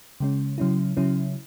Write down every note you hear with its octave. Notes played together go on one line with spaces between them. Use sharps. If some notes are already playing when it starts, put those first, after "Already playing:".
C#3 G#3 C#4
C#3 F#3 C#4 E4
C#3 F#3 C#4 E4